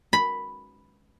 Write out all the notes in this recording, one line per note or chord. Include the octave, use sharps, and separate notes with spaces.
B5